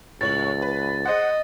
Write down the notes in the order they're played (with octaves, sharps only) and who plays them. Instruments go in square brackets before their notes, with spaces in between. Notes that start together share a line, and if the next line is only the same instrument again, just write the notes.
[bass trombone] C#2 [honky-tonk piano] A2 C#5 F#7 [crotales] A6
[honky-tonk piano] B4
[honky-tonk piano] G#4 C5 F#5 [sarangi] D#5